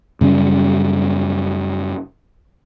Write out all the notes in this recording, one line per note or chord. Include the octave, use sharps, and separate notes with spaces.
F#2 C#3 G3 C#4